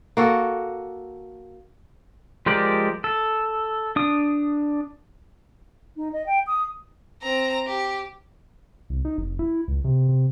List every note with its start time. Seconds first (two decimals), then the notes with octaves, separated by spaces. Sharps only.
0.17 A#3 F#4 A4
2.46 F3 G#3 G4 A#4 D5
3.04 A4
3.96 D4 D#6
5.97 D#4
6.13 D#5
6.26 G5
6.47 D#6
7.22 C4 A#5
7.67 G4
8.90 C2
9.05 D#4
9.18 F1
9.39 E4
9.68 C#2
9.84 C3
10.09 C3